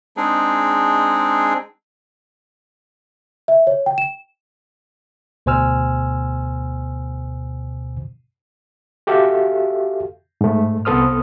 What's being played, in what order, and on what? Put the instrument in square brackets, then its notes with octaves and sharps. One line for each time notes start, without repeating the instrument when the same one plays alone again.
[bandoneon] G#3 C4 D4 D#4 G#4
[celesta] E5
C#5
G5
E7
[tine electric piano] D2 B2 C5 G#5 E6 F6
[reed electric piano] F#4 G4 A4 E5 F5
G#2 A3
C2 B3 A4 C5 D#6 F6